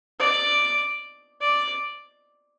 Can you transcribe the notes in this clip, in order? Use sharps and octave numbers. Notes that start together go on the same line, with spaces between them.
D5
D5